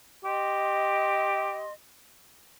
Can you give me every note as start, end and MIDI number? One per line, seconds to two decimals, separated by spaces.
0.24 1.64 67
0.24 1.72 75
0.24 1.72 84